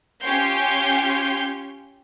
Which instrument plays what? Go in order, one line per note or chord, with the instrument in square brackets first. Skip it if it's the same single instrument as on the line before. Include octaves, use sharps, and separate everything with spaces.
[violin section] C#4 F4 G4 C#5 C6 G6